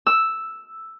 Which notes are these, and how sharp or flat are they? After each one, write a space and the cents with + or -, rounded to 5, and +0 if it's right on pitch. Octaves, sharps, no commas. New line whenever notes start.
E6 +0